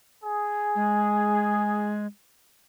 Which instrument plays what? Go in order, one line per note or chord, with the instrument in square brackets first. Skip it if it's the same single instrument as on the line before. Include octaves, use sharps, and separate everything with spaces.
[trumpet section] G#4
[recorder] G#3